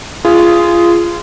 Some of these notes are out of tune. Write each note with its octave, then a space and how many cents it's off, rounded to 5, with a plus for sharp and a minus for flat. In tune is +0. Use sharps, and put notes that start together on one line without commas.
F4 -25 G#4 +0